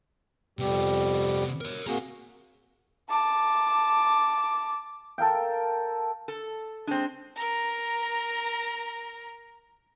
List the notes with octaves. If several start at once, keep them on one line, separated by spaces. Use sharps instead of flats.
F2 C3 G3 B3 G4
A#4 C#5
A#3 C4 F#4 G#4 A#5
A5 D6
A4 A#4 F5 G5
A4
G#3 C4 D4
A#4 A#5